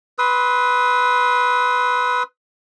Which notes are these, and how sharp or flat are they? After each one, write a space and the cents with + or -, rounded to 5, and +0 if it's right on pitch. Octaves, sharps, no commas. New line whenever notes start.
B4 +0 C6 +0 D#6 +45